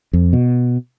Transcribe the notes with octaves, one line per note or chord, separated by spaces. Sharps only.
F2
B2